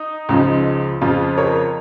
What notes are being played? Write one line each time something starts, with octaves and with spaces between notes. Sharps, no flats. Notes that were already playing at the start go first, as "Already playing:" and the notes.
Already playing: D#4
C#2 C#3 F3
F2 C#3 F3 F4
A#4 C#5